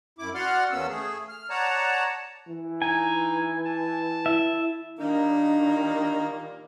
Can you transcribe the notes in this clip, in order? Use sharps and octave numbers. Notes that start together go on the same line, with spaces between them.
F#2 E4 D6
F#4 D5 F#5 C6 F6
E2 A#3 B3 C#4 E6
A3 G#4
F6
C#5 D5 F#5 A5 A#5
E3
D#4 G#5
A5
E4 E5
A#2 D#3 G3 A#3 D4 D#4